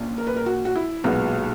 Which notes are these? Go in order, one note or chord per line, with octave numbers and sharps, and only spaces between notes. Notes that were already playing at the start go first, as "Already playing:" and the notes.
Already playing: A#1 A#2 C#4
A#4
B4
A#4
F#4
F#4
E4
B1 A#2 G#3 B3 F#4